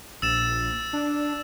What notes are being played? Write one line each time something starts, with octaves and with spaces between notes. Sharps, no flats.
A#1 E6 A6 E7
D4